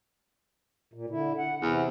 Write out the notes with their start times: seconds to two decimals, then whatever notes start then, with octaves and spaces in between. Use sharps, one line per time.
0.93 A#2
1.10 D3 E4
1.38 F#5
1.62 E2 C3